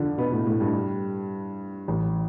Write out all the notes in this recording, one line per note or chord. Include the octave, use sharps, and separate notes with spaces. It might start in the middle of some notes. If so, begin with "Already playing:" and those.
Already playing: F2 D3 F3 D4
B2 B3
A2 A3
A2 A3
G2 G3
A1 A2